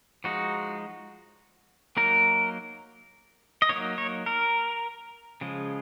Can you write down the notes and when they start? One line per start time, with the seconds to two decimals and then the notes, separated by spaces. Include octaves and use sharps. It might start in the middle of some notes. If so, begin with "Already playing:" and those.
0.24 F3 G#3 D#4 F#4
1.97 F#3 A#3 D#4 A#4
3.62 D#5
3.69 F#3 A#3 D#4 C#5
3.98 C#5
4.26 A#4
5.41 C#3 F3 G#3